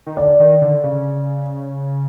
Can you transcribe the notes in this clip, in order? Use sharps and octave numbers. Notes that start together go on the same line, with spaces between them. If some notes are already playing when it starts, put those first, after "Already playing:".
D#3
D3 D5
D#3
D3
C#3